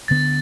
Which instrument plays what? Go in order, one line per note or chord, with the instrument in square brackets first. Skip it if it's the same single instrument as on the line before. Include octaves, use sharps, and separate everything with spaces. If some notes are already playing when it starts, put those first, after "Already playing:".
[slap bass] D2 D3 B3 [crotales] A6